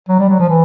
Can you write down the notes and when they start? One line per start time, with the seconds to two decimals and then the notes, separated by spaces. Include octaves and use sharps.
0.09 F#3
0.19 G3
0.29 F#3
0.40 F3
0.49 E3